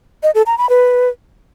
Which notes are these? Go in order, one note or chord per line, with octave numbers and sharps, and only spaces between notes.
D#5
A4
A#5
B5
B4